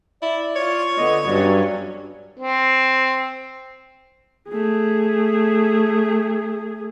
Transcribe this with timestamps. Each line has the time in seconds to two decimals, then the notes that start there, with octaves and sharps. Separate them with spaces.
0.22 E4 D5
0.56 F4 C#5
0.98 D3 B3 D#5
1.27 G2 F#3 C#4 D5
2.38 C4
4.49 A3 G#4